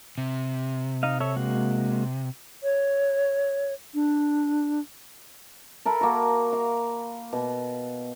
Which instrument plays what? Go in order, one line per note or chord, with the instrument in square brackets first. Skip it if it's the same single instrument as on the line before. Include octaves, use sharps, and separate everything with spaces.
[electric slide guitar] C3
[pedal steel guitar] D#4 D#5 F5
A4 C#5 E5
G#3 A#3 F#4
[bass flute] C#5
D4
[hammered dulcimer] A4 A#4 B5
A#3 F#4
F5
B2